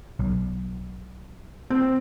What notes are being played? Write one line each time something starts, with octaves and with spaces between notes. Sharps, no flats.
B1
C4